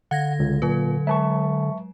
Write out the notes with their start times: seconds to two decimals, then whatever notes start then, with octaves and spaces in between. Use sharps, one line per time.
0.11 D3 F5 F#5 G#6 A#6
0.39 C#2
0.62 A#2 F#3 B4
1.07 F#3 G#3 E5 A5 C#6